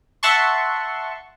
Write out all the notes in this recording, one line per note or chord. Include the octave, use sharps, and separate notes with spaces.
E5 F#5 A5 C6 C#6